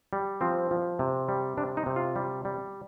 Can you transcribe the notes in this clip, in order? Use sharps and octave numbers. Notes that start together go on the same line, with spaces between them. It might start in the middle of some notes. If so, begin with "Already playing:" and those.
G3
F3 C4
F3
C3
G3
C3 D4
D#4
C3
F4
G3
G3